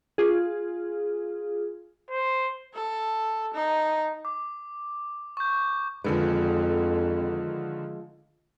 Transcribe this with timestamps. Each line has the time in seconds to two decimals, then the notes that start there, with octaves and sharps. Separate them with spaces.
0.18 F4 G#4
2.10 C5
2.74 A4
3.54 D#4
4.25 D6
5.37 C#6 G6
6.04 F2 D3 D#3 F3 G#3 B4